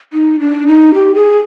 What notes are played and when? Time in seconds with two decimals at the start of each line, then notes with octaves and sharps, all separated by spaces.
0.13 D#4
0.40 D4
0.67 D#4
0.94 G4
1.15 G#4